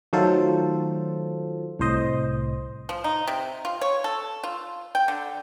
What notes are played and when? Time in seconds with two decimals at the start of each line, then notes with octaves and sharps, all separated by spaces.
0.13 D#3 F#3 A3 F4 A4 C5
1.79 C2 A2 C5 D#5
2.89 F3
3.04 D#4
3.28 C3
3.65 F4
3.81 C#5
4.04 A4
4.44 F4
4.95 G5
5.08 D3